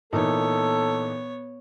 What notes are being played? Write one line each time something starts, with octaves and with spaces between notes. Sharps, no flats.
A#2 E3 B3 D#4 A4 C#5